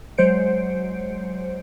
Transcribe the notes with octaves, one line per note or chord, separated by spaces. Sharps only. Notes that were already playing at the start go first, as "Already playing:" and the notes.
F#3 G#3 C5 C#7 D7